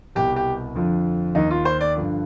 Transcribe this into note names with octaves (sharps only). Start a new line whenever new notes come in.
C2 B2 G4
G4
F2 D3 F3
D#2 D#3 D#4
F4
C5
D5
G2 D3 F3